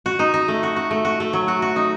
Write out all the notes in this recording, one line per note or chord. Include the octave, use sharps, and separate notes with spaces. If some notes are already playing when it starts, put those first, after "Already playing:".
F#4
D#4
D#4
A3
F#4
F#4
A3
F#4
A3
F#3
F#4
F#4
D#4